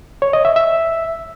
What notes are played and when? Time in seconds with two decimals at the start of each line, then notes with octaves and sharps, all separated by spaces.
0.22 C#5
0.33 D#5
0.45 E5
0.56 E5